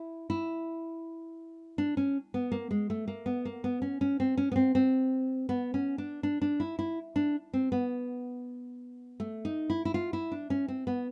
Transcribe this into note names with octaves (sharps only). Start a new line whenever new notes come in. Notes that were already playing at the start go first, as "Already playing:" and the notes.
Already playing: E4
E4
D4
C#4
B3
A#3
G#3
A3
A#3
B3
A#3
B3
C#4
C#4
C4
C#4
B3
C4
C4
B3
C#4
D4
D4
D4
E4
E4
D4
C4
B3
A3
D#4
E4
E4
F4
E4
D4
C#4
C4
B3